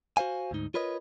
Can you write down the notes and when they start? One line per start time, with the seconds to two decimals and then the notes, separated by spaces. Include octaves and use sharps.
0.17 F#4 C5 F5 G#5
0.51 D2 G#2 D#4
0.74 F4 A#4 B4 C#5 D#5